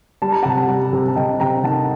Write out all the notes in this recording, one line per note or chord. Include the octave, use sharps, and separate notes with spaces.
G3 A5
A#5
C3 F#5 A5
G3
C3
A5
C3 D#5 G5
C3 G5 A#5
D#3 F#5 A5